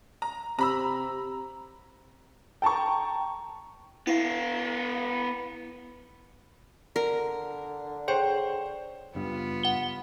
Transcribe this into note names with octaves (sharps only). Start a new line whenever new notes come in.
A#5
C3 A#5 B5 E6
G5 A5 A#5 C#6
B3 E4 F5
D3 A#4
G#4 C5 C#5 G5
F#1 G2 B3 F4
F#5 G7